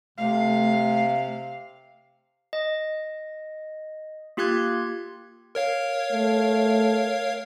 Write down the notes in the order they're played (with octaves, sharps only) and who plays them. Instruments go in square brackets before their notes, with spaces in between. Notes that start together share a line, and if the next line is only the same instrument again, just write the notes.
[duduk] C3 [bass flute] A3 [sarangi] F5
[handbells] D#5
A#3 F4 G4 C6 F#6 G#6
[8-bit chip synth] A#4 C#5 F5
[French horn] A3